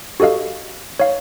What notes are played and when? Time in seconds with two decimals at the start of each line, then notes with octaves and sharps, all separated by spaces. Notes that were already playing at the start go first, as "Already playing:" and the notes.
0.20 F#4 G4 A4 D#5 F5
1.00 C#5 F5